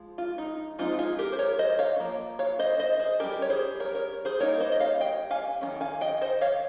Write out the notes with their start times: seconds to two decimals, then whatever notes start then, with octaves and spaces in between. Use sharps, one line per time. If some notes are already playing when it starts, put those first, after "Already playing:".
Already playing: F3 G#3
0.18 F4
0.38 D#4
0.79 F3 G#3 C4 D#4 F4
0.99 F4 G#4
1.19 G4 A#4
1.32 C5
1.39 A#4 C#5
1.59 C5 D#5
1.79 C#5 F5
1.99 F3 A#3
2.39 C#5 F5
2.59 C5 D#5
2.79 C5 D#5
2.99 G#4 C5
3.20 G3 C#4 G4 A#4
3.42 C#5
3.50 G#4 C5
3.80 A#4 C#5
3.95 A#4 C#5
4.25 G#4 C5
4.40 G3 A#3 D#4 A#4 C#5
4.60 C5 D#5
4.72 D#5
4.80 C#5 F5
5.00 D#5 G5
5.31 F5 G#5
5.61 D#3 A#3 C#4
5.81 F5 G#5
6.01 D#5 G5
6.21 C5 D#5
6.41 C#5 F5